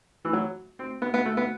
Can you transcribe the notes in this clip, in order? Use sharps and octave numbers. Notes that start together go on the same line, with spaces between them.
E3
F#3
C4
B3
B3
A3
B3